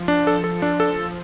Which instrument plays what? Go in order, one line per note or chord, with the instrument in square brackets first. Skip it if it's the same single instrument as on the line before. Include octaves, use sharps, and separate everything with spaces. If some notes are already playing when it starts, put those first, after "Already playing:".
Already playing: [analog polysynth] F3
[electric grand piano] D4
A4
A4
D4
A4